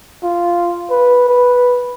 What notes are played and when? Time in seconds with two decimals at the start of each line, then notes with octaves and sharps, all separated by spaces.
0.23 F4
0.90 B4
1.29 B4